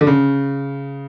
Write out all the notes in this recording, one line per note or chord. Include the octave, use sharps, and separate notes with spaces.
D3
C#3